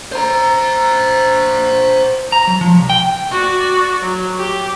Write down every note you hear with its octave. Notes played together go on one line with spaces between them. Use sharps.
C5 A#5
A#5
F#3
F3
C2
G5
F#4 D5
F#3
G4